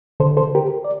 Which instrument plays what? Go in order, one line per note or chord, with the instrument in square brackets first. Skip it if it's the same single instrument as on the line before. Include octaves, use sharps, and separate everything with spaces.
[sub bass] D3 [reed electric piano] A4 C5
[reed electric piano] A4 C5
G4 A#4
D5